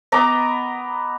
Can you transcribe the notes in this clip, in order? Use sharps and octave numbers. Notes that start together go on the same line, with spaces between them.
B3 D#5 A#5 D6